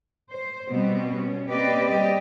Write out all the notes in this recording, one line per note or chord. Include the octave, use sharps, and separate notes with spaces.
C5
B2 G3 B3 C4
C#4
A#3 C4 G4 B4 D5 D#5
G3 G4 D5 D#5